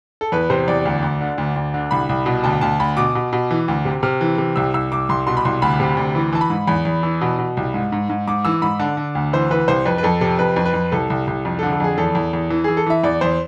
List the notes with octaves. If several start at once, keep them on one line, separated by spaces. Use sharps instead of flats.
A4
E2 B4
C3 C5
E2 D5
D2
D2
D3
D2
D2
D3
C2 B5
C2
B2
D2 A5
D2 A5
D2 B5
B2 D6
B2
B2
E3
D2
C3
C3 F6
E3
C3
C2 E6
C2 E6
C2 D6
C2 C6
B2 C6
B5
C2 C6
D2 B5
C3
D2
E3
E3 A5
B5
G#2
E2 B5
E2
E3
B2
B2
C2
G#2
G#2
G#2
G#2 D6
E3 E6
G#2 B5
D3 A5
D3
D2
E3 C5
E3 B4
C2 C5
F2 B4
B4
F2 A4
C3 A4
F2 B4
F2
B4
F2
C2 A4
C2
C2
F2
D3 A4
A4
F2 G#4
E2 A4
E2
E2
E3
E3 G#4
A4
E3 E5
E2 D5
E2 C5